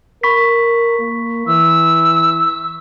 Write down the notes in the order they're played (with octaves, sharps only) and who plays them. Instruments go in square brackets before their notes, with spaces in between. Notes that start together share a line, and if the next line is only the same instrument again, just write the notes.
[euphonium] A#4 [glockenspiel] B5 C#6 B6
[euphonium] A#3
[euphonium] E3 [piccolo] E6